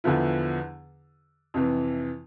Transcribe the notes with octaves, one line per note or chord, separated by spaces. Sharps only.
E2 D3 F3 B3 E4
F2 C3 E3